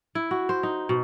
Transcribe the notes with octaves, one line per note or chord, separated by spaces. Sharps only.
E4
F#4
C5
D#4
B2